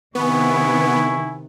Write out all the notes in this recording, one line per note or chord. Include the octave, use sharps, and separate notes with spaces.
C3 D#3 B3 E4 G#5 C#6